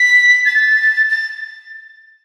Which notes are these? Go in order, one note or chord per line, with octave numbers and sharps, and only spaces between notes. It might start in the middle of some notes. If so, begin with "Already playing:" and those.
Already playing: B6
A6
A6